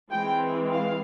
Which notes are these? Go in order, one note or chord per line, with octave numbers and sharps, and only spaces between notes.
E3 G#3 C4 G5
F5